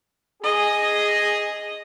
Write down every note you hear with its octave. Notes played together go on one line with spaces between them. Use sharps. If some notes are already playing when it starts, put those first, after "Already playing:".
G#4 D#5